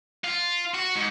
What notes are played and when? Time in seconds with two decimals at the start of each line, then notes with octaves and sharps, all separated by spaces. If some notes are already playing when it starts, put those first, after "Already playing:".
0.24 F4
0.74 F#4
0.96 G#2